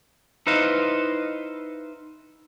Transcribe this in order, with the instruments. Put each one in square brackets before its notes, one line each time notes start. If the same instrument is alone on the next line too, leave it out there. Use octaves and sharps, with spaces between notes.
[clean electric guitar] D#4 E4 B4 C5 D#5 F5